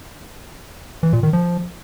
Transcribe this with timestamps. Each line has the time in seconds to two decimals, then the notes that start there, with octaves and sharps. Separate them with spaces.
1.03 E3
1.13 A#2
1.23 D#3
1.33 F3